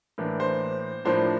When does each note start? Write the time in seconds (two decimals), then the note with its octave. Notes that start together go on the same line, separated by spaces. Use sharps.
0.18 A2 E3 A#3 D4
0.40 C5
1.05 A2 F3 A#3 D4 C5